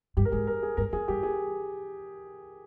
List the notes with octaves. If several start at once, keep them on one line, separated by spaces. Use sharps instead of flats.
G2 G4
A#4
G#2 G#4
A#4
G#4
G2 A#4
F2 G#4
G2 G4
G#4